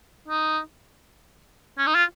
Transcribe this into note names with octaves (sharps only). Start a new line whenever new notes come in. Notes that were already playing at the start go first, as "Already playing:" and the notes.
D#4
C#4
D#4
F4